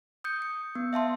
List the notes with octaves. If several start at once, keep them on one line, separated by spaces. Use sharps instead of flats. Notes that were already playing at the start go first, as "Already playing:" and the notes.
D#6 G6 C#7
C#7
B3
E5 F5 A5 C6